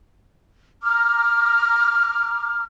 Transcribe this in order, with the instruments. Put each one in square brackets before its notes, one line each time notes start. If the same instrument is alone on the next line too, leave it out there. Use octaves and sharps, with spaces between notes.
[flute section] A#5 D6 F6